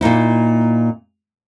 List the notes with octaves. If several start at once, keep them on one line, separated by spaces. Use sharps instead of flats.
A#2 A#3 D#4 E4